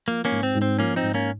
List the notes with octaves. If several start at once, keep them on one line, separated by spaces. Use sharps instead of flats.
F3 A#3
A#3 C#4
G#2
C4
G#2
C4
F3 A#3 C#4
C4 D#4
G#2
A#3 C#4